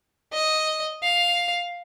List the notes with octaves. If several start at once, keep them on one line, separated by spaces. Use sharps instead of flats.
D#5
F5